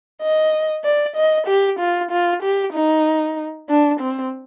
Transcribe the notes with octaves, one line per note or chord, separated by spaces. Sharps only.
D#5
D5
D#5
G4
F4
F4
G4
D#4
D4
C4